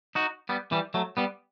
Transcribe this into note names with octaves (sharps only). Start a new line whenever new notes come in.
D#4 F#4
G3 B3
E3 G3
F#3 A3
G3 B3